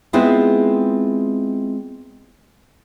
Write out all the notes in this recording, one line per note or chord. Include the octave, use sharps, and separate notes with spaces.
G#3 B3 C4 E4 F4 G#4